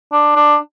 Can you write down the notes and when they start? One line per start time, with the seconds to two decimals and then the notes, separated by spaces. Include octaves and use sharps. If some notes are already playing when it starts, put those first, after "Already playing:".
0.12 D4
0.36 D4